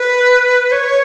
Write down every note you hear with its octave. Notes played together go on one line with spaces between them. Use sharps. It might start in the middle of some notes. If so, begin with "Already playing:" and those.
Already playing: B4
C#5